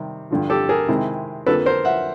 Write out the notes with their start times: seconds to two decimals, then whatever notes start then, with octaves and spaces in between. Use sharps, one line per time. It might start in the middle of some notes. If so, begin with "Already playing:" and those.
Already playing: C3 D#3 G3
0.31 G2 D3 F3
0.50 G4 A4
0.69 G#4 A#4
0.88 C3 D#3 G#3 C4 E4
1.46 F2 D3 F3 A#3 A4 B4
1.66 A#4 C5
1.85 E5 F#5